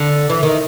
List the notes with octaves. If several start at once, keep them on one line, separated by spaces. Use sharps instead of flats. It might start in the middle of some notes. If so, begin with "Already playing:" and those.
Already playing: D3
E3
D#3